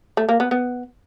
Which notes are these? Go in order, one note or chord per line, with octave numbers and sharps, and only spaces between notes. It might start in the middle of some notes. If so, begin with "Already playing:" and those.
A3
A#3
B3
B3